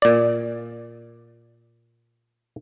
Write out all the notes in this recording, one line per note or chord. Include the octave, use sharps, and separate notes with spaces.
A#2 D5